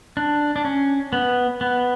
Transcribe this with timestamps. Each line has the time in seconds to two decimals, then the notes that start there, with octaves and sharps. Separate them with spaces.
0.17 D4
0.56 D4
0.65 C#4
1.13 B3
1.61 B3